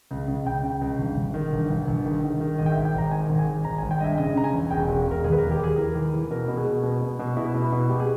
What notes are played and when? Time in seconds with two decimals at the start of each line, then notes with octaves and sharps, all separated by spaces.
0.11 C#2
0.28 C#2
0.46 C#2 G5
0.63 C#3
0.81 C#2
0.98 G1
1.17 G1
1.34 D#3
1.53 G1
1.70 G1
1.87 G1
2.05 D#3
2.23 D#3
2.41 D#3
2.58 G#1 D#5
2.66 G5
2.72 E5
2.77 G#1
2.85 G5
2.94 G#1 A#5
3.11 D#3 G#5
3.29 G#1
3.39 G#5
3.47 G#1
3.64 G#1 A#5
3.78 G#5
3.83 G#1
3.91 G5
4.00 G2 D#5 E5
4.17 C#3 D#5
4.35 C#3 A#5
4.44 G#5
4.53 E2
4.71 E1 G5
4.89 E1
5.07 E1 A#4
5.24 D#2 G#4
5.32 B4
5.38 A#4
5.43 D#2
5.51 G4
5.60 D#2 G#4
5.78 E3 A#4
5.95 D#2
6.13 E3
6.31 B2 A#4
6.48 B2
6.57 G#4
6.66 B2
6.83 B2
7.01 B2
7.19 B2
7.36 B2 E4
7.54 B2
7.64 E4
7.72 B2
7.90 B2 G4
8.00 G#4